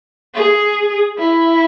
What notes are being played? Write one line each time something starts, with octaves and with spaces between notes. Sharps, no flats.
G#4
E4